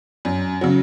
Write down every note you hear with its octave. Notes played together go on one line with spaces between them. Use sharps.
F#2
C#3 F#3